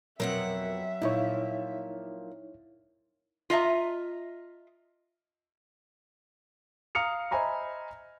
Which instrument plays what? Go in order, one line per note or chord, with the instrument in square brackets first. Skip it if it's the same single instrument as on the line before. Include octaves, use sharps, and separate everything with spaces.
[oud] F2 B2 [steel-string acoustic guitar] F#3 C4 F#5 [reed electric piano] A#4 [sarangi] E5
[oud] A#2 F3 [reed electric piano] D#4 E4 C#5
[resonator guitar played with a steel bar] F4 D#5 E5 A#5
[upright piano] F5 A#5 D#6 F6 C#7 F7
C5 D#5 E5 G#5 A#5 B5